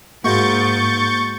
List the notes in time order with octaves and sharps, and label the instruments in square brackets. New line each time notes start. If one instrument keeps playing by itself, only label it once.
[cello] G#2 [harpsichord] G#3 F#4 [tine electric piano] A#3 [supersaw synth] C#6 G6 A6